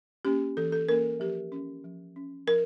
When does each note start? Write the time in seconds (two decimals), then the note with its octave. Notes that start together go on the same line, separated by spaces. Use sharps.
0.25 A#3 C#4 G4
0.57 E3 A4
0.72 A4
0.89 A#3 C#4 A#4
1.20 F3 G4
1.52 C#4
1.84 F3
2.16 C#4
2.47 F3 A#4